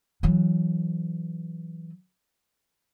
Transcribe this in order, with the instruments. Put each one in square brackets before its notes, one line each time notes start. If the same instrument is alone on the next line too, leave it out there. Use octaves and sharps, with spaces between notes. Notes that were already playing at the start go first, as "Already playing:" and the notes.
[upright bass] E3 F#3